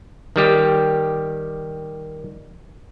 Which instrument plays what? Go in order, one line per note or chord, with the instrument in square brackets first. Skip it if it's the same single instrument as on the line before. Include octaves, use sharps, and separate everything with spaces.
[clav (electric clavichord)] D#3 G3 G4